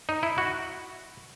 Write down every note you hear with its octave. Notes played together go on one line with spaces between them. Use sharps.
D#4
E4
F#4